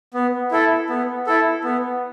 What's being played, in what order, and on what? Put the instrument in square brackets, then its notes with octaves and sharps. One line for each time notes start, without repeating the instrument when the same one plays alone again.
[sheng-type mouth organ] B3
E4 A4
B3
E4 A4
B3